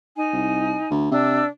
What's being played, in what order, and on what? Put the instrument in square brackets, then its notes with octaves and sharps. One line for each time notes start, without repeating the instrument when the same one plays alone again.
[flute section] D#4 G#5
[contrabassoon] C2
D2
[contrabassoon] C3 [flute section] D4 E6